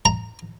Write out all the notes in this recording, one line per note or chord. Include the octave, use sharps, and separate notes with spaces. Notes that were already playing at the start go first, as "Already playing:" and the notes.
A#5